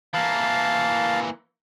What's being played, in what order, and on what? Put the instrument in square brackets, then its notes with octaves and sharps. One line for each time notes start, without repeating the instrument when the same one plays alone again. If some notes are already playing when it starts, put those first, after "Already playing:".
[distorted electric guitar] E3 A#3 [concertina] F5 A5